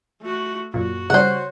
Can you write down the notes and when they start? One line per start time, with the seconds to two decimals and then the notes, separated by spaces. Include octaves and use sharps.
0.21 A3 F#4
0.74 F#2 A#2 F#4
1.10 C#3 G3 C5 C#5 F#5